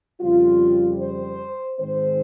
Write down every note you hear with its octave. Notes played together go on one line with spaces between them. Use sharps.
F2 C#3 G3 C4 F4
C5
G#2 D#3 G#3 C4 C5